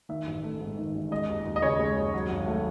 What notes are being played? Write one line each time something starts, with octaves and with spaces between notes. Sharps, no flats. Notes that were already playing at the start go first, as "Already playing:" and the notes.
D#3 E5
A1
A3
G#2
D#3
A1
G#3 D#5
D#2
D#2
D#5
C#3 C#5
G#3
D#2
F#3
G#1
A3